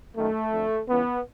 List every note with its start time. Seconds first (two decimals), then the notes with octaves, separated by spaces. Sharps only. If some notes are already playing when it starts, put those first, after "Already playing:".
0.15 F#2 D#3 A3
0.51 F2 D3
0.87 C#2 C#3 E3 B3